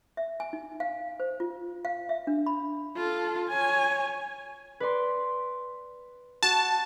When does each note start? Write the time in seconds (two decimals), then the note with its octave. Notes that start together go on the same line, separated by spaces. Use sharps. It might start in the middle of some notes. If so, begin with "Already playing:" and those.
0.17 E5
0.40 G#5
0.53 D#4
0.80 F5
1.20 C5
1.40 F4
1.85 F5
2.09 E5
2.27 D4
2.46 B5
2.96 F4 A4
3.49 C#5 G#5
4.80 B4 D5 C6
6.43 F#4 A5